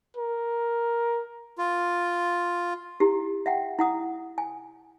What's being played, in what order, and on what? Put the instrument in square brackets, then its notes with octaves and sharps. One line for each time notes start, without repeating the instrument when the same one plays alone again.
[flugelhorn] A#4
[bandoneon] F4
[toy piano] E4 G4
E5 F#5 G5
E4 F#5 D#6
G#5